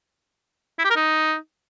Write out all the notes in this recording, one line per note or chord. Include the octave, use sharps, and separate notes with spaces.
E4
G4
A#4
D#4